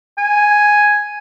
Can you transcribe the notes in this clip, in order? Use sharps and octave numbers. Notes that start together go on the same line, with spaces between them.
G#5